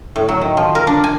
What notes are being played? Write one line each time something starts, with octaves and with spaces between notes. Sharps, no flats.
A2
F#3
D#3
F3
A#4
D4
G#5